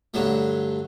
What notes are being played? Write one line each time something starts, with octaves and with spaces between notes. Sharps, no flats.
G2 D3 F#3 A3